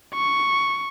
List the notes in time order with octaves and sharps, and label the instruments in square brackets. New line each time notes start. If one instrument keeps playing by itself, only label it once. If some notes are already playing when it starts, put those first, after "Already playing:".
[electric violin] C#6